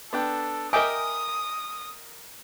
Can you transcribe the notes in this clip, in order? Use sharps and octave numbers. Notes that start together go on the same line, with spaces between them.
B3 D4 A4 G5
A#4 D#5 E5 G5 G#5 D6 D#6